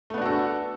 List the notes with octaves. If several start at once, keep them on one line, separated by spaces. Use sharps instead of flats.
A3 B3 D4 F#4 A4